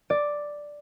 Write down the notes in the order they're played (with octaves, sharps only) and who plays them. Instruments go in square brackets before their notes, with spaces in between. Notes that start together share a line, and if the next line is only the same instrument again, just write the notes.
[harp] D5